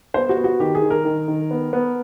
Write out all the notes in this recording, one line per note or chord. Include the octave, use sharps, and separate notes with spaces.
B3 C5
F#4
B3
F#4
D#3 G4
G#4
D#3
A#4
D#3
D#3
B3
B3